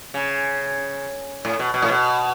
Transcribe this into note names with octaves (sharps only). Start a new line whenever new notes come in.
C#3
A2
B2
B2
A2
B2